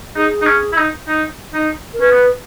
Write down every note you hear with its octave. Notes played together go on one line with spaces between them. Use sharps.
D#4 G#4
D#4
C#4
E4
D#4
D#4
D#4
A#4
C#4 B4
B3